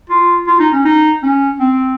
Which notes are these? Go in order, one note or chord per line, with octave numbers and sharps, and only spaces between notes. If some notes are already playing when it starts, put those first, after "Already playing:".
F4
F4
D#4
C#4
D#4
C#4
C4